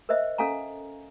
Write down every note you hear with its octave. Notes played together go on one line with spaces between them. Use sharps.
A#4 C5 D#5 E5
C#4 A4 F5 G#5 A#5